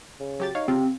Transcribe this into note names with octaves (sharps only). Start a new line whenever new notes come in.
C#3
F#3 G4 A6
D#4 C#5 F5
C#3 C4 F4 G4